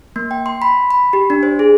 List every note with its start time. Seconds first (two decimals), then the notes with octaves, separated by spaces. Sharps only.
0.16 A#3
0.31 G5
0.46 C6
0.62 B5
0.91 B5
1.13 G4
1.30 D4
1.43 C5
1.59 G#4